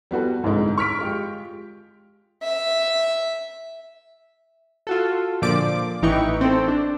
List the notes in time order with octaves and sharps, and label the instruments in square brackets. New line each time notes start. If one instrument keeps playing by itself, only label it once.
[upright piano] G3 B3 F#4 A4
C2 G#2 D3 G#3
C#6 F6 B6 D7
G#3 F4 G4
[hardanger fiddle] E5
[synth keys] F4 F#4 A4
A#2 D3 F3 D5 D6
A1 E3 D#4 E4 G5 C#6
C4 A4
D4